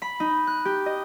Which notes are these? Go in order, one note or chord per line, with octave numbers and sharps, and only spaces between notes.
B5
D#4
F#6
G4
D#5